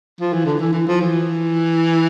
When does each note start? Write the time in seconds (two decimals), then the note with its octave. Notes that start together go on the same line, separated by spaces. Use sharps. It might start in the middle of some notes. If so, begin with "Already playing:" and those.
0.20 F3
0.33 E3
0.46 D3
0.60 E3
0.73 E3
0.87 F3
1.01 E3